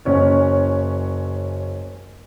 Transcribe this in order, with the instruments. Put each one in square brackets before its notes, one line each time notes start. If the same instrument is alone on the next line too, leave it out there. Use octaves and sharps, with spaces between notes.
[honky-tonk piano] F#1 C#4 C#5